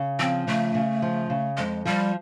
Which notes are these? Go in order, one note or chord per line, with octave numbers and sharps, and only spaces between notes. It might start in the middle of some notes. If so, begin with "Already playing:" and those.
Already playing: C#3
F3 C4
C#3 A3
C#3
F3
C#3
F2 G#3
F3 G3